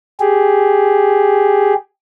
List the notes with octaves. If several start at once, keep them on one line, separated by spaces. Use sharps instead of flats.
G4 G#4